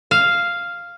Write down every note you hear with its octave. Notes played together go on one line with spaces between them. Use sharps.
F5